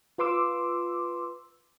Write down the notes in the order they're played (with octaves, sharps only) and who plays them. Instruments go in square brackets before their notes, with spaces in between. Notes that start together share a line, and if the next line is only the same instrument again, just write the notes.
[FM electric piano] F4 B4 C6 D6 E6